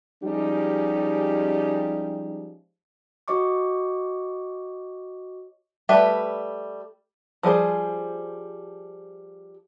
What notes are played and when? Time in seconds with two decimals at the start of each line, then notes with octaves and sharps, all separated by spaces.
0.22 F3 G3 G#3 C#4 D#4 G4
3.28 F#4 C#5 D#5 C#6 D6
5.89 G3 A3 B4 E5
7.43 F3 G3 G#4 C5